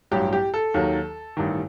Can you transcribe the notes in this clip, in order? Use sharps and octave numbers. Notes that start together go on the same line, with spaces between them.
A1 G2 F#3 G4
G4
A4
D#2 D#3 F#3
A1 G2 D#3